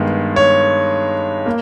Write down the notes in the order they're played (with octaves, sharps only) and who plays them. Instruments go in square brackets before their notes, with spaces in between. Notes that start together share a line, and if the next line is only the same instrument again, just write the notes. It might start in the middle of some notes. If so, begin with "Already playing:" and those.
Already playing: [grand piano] G2 D#3 G#3 B3
C#5
A#3